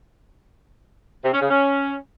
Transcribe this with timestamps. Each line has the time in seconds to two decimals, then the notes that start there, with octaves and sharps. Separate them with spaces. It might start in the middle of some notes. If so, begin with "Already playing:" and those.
1.24 C3
1.33 C#4
1.41 C#3
1.49 C#4